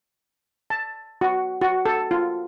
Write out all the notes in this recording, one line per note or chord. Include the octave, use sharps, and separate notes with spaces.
A5
F#4
F#4
A4
F4